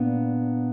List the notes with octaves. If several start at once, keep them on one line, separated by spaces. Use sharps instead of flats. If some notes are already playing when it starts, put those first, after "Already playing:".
Already playing: A#2 B3 D4